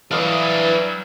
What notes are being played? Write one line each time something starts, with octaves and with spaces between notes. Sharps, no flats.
E3 F#3 G3 D4 C#5 F5 D#6 E6